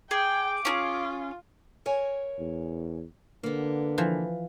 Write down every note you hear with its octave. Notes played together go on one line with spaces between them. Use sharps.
G#4 G5 D6
C#4 D#4 F4 G#4
A#4 C#5 G#5
E2
D3 A#3 B3
E3 F3